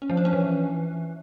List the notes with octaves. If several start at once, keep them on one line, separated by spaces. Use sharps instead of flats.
C#4
F3
D4
C#4
E3